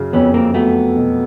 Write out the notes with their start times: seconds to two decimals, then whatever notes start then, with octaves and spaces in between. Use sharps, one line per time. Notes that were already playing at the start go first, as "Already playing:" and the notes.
Already playing: F#2 C#3
0.13 F2 B3 C#4
0.34 A#3 C4
0.54 F#3 A3 B3
0.96 B2